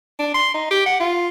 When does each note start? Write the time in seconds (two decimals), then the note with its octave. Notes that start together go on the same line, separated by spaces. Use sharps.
0.19 D4
0.34 C6
0.54 D#4
0.71 G4
0.86 F#5
1.00 F4